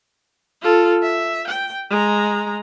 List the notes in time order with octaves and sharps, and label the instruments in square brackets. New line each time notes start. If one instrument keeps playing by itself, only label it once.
[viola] F4 A4
E5
G5
G#3 A#5